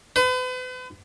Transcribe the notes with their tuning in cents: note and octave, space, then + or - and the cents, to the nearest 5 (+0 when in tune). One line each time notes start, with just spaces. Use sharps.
B4 +40